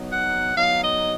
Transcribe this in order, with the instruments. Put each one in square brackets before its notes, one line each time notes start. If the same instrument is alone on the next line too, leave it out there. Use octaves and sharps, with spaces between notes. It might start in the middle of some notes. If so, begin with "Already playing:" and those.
Already playing: [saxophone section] F#3 B3 D#4
F#5
F#3 B3 D#4 F5
D#5